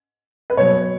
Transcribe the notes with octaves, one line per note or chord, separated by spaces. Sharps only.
B4
B2 F#3 B3 C#5